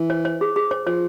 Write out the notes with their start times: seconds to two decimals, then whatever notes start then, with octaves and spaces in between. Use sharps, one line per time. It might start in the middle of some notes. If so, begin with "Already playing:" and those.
Already playing: E3
0.10 C5
0.25 C5
0.41 G#4
0.56 G#4
0.71 C5
0.87 F3 C5